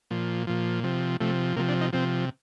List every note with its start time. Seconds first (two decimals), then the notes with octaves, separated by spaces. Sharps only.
0.11 A#2 F3
0.47 A#2 F3
0.84 C3 F3
1.20 C3 F3 A3
1.56 C3 F3 A#3
1.69 D4
1.81 D#4
1.93 C3 F3 C4